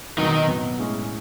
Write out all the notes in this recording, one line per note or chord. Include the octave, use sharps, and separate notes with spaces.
B2 D#3 F#3 B3 D#4
B2 F#3 B3
A2 G#3 C#4